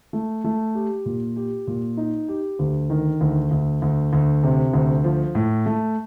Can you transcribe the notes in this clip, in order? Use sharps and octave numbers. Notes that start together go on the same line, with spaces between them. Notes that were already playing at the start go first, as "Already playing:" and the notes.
A3
A3
G4
A#2
G4
A#2
D#4
G4
D2
D#3
D2
D2
D2
D2
C3
D2
F3
A2
A3